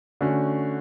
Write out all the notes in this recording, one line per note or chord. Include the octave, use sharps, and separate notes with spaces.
D3 A3 C#4 F#4